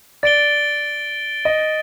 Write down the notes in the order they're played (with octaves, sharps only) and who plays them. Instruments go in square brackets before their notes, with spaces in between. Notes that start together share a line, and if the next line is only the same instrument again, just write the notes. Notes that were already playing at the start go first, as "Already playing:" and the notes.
[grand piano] D5 [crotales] A6 D7 G7
[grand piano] D#5